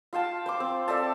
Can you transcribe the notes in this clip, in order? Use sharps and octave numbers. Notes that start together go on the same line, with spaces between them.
F4 F5 G5 A5
C5 C6 D6
C4
A4 D5 E5 A5